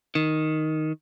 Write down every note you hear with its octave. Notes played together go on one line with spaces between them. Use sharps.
D#3